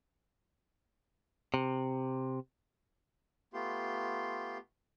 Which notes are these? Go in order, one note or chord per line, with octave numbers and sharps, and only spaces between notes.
C3
A3 B3 F4 G4 C6